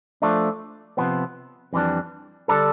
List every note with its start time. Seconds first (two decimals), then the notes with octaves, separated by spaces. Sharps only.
0.22 F3 A3 D4
0.97 C3 F3 B3
1.73 F2 E3 G3 D4
2.48 D3 G3 D4 A4